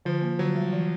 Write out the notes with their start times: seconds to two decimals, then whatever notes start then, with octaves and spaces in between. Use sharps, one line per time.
0.05 D3 F3
0.22 A#3
0.39 D3 F#3
0.55 G3
0.73 E3